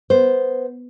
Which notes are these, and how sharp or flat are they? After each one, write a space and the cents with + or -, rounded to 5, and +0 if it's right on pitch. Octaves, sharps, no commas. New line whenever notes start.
B3 +0 C5 +0